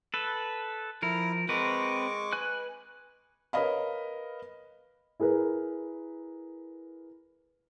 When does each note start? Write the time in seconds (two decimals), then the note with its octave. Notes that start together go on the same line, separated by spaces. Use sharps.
0.14 A4 B4
1.02 F3 E4 A#4
1.49 G#3 C4 A#4 B4 C#6 D6
2.33 B4 G#5 F#6
3.53 A#4 B4 C#5 D#5 F5 B5
5.20 E4 G#4 A#4 B4